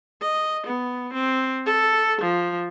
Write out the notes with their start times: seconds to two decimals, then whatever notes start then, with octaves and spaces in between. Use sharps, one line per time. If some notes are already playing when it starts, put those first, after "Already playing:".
0.22 D#5
0.67 B3
1.14 C4
1.66 A4
2.22 F3